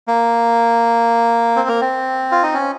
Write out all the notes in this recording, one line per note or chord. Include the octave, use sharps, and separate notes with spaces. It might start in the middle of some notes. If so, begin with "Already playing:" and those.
A#3
C4
A#3
C4
F4
D#4
C#4